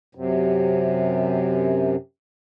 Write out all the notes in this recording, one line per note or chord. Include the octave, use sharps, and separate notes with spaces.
F#2 C3